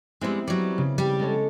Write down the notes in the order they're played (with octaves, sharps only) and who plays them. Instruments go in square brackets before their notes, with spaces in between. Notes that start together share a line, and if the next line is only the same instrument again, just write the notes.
[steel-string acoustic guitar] G3 G#3 [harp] B3 C4 E4
[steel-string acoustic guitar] F#3 G3 [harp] D5
[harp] C#3
[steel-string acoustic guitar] G3 G4
[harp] G#3 A4 C#5